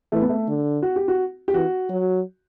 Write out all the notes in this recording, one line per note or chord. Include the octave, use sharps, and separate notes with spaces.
E3 A3
B3
A3
D3
F#4
G4
F#4
G4
E3 F#4
F#3